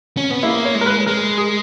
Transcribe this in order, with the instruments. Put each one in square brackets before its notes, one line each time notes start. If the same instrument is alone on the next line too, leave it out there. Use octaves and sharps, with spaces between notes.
[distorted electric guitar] C#4
B3
[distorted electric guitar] A#3 [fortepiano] E4
[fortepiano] C#5
[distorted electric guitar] G#3
[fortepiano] A#4
B4
[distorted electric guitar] G#3 [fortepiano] A#4
[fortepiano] G#4